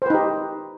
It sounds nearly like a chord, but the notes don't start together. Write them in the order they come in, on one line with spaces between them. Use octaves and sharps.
C5 B4 D#4 G4